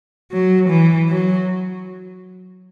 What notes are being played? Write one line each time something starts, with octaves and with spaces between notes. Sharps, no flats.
F#3
E3
F#3